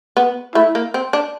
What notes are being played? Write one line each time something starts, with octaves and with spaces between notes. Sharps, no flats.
B3
A3 E4
A#3
C4
D4